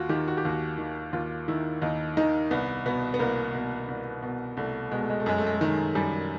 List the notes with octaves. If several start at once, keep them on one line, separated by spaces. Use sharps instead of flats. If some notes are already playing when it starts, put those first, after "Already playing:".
Already playing: D#2 F4 F#4
D#3 G4
F#4
G4
D#2 F#4
D#3
D#2 F4
D#3 E4
D#2 D#4
D#3 D#4
C2 B3
B2 B3
B3
C2 A#3
B2
C2
B2
C2 A3
B2 G#3
A3
G#3
A3
F#2 G#3
A3
G#3
A3
D#3 G#3
F#2 G3